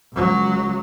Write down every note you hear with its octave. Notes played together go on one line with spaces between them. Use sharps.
C#2 F#3